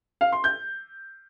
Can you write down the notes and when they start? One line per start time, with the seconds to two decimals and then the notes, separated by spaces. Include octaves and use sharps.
0.21 F5
0.32 C6
0.44 G6